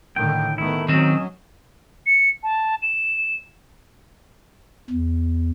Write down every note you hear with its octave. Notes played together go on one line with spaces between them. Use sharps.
A2 D3 D#3 G5
D#3 A3 B3 E4
D#3 F#3 C4 C#4 D#5
C#7
A5
E7
E2